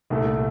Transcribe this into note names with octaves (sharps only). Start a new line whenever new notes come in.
C2 A#2 A3